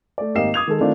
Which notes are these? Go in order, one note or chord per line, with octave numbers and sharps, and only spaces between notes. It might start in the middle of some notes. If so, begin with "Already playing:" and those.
A3 D5
G#1 A#3 G4 D#5 C7 E7
D6 D#6 G#6 F7
D#3 G#3 A4
D#3 A3 C4 D4 F4